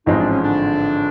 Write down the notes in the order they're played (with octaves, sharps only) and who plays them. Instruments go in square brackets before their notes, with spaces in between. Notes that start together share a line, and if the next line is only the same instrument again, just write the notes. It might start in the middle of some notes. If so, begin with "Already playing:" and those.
[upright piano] A1 G#2 F3 G#3 C4 [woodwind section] D#4
[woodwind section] D4
C#4
D3 D4